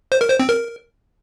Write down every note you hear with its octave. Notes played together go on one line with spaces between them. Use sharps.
C5
A#4
C5
C4
A#4